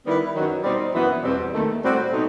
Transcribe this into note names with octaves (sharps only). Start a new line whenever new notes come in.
D#3 G3 B3 E4 B4
F#2 D#3 F#3
B2 G3 C4 D#4
F#2 E3 B3
E2 B2 G3 C4
D#2 D#3 A3
A2 G3 C4 F#4
B2 A3 D#4